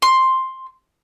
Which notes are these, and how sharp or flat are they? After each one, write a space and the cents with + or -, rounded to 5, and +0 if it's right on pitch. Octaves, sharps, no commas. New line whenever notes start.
C6 +5